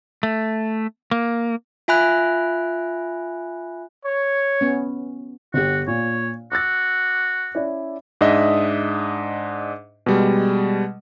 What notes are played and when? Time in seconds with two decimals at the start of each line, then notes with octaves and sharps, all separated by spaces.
0.23 A3
1.11 A#3
1.88 F4 E5 G#5 B5 F#6
4.05 C#5
4.61 B3 C#4
5.54 G1 F#4 G4
5.87 A#2 C#5
6.52 F#4 D6 E6 A6
7.55 C#4 E4 D5
8.21 G#2 D4 D#5 E5 D#6
10.06 B2 G3 G#3